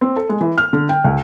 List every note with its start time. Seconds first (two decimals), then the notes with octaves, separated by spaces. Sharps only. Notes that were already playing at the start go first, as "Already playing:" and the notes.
0.01 C4
0.16 A4
0.29 G#3
0.41 E3
0.58 F6
0.73 D3
0.89 G5
1.04 C#2